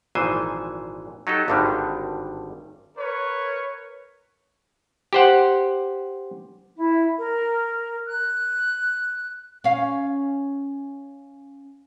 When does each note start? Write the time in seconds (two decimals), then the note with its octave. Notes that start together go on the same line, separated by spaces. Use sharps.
0.15 G#1 A#2 E3 F3 C5 G#5
1.27 F#3 D#4 G4 A4
1.48 G#1 G2 D3 D#3 G3
2.95 A#4 B4 C#5
5.13 G4 C5 F#5
6.76 E4
7.18 A#4
8.07 F#6
9.64 C#4 F5